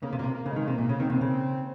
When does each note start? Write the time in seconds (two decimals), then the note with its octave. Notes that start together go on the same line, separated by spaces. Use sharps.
0.03 C#3 A#3
0.13 C3
0.19 A#2 A#3
0.24 C3
0.35 A#3
0.46 C#3
0.51 G#3
0.56 D#3
0.67 C3 A#3
0.78 A#2
0.89 C#3
0.99 D#3 C4
1.08 C3 A#3
1.15 C4
1.21 C#3